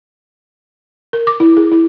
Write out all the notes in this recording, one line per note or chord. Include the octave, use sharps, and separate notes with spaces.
A#4
D6
E4
G#4
E4